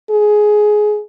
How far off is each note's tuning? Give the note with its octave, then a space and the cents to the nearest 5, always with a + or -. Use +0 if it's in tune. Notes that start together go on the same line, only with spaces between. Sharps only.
G#4 +15